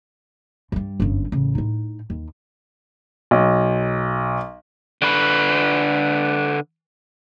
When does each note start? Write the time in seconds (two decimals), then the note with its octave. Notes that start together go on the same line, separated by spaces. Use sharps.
0.72 G2 G3
1.00 G1 F#2
1.32 A1 C#3
1.55 A2 D#4
2.10 D#2
3.31 B1
5.02 D3 B4